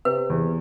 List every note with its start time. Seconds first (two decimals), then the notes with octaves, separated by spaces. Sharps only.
0.05 C3 B4
0.30 E2